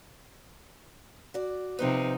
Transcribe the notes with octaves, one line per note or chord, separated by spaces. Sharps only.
F#4 D5
C3 F3 D#4 B4 C5 F#5